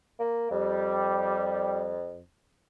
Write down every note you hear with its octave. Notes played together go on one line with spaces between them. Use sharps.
A#3
F2 G3